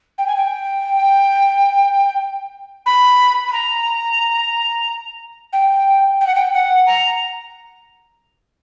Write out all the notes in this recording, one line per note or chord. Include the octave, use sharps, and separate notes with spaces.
G5
G#5
G5
B5
B5
A#5
G5
G5
F#5
G5
F#5
A#5